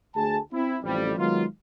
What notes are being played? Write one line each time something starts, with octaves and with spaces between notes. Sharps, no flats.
D2 A3 G#4 G#5 A5
C4 E4
A1 F2 G3
D#3 F#3 G#3 B3 D#4 F4